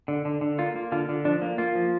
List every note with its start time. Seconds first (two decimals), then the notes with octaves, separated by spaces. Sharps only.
0.08 D3
0.25 D3
0.41 D3
0.58 A#3 F4
0.76 A#3
0.92 D3 F4
1.09 D3
1.25 F3 D4
1.42 A#3
1.58 A#3 F4
1.75 F3